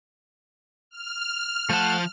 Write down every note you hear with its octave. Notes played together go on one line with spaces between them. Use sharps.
F6
F3 A3 F#5 A5